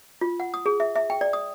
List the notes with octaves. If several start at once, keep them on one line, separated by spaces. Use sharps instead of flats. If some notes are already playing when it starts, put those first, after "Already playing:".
F4
F#5
D#6
G#4
E5
E5
G5
D5
D#6